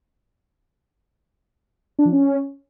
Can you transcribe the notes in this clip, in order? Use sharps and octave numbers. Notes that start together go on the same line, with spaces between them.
D4
F3
C#4